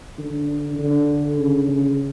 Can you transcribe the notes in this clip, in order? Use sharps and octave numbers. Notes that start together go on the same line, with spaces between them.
D3
D3
C#3
C#3